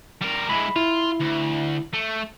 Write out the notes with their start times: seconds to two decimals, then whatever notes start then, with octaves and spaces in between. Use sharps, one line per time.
0.22 G3 A#4
0.50 G#3 E4 B5
0.76 E4 F4
1.20 D2
1.94 A3